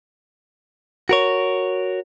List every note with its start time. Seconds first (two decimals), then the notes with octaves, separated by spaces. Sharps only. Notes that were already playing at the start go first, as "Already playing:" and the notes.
1.09 F#4 A#4 C#5